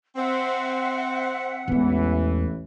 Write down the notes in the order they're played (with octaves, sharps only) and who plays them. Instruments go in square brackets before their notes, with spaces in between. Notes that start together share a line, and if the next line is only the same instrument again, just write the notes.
[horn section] C4 [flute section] E5 F#5
[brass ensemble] A1 E3 [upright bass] E2 G#3